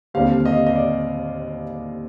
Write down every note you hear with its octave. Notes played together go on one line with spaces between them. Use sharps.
D#2 D3 G3 C4 F5
D#5
D#5
D5